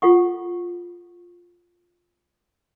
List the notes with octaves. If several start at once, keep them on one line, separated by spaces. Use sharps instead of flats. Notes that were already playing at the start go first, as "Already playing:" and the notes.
F4 A4 F#5 C#6